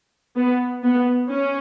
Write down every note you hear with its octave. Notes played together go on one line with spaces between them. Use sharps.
B3
B3
C#4